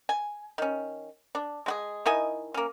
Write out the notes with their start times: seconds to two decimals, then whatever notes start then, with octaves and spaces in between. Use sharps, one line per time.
0.09 G#5
0.58 D#3 C#4
1.35 D4
1.66 G#3 F#4 G#4
2.06 D#3 E4 D#5 G#5
2.54 A#3 C#4